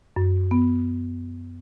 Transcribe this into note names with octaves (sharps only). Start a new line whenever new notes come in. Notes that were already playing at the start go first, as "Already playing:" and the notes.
F#2
B3